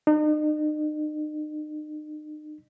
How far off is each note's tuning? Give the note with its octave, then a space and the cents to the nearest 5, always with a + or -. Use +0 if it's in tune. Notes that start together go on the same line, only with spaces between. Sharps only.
D#4 -40